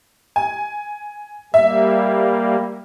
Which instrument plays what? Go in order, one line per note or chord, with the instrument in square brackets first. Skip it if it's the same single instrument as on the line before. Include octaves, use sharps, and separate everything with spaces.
[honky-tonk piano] G#5
[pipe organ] G3 A#3 [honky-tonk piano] E5